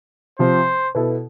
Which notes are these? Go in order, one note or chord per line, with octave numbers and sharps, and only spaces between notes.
C3 F3 C4 C5
B2 B3 E4 A4